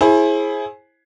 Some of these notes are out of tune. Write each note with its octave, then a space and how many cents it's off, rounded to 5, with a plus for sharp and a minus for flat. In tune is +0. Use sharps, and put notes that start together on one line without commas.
E4 +0 G#4 +15 C5 +35